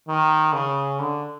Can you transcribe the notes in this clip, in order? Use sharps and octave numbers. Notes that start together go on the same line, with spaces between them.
D#3
C#3
D3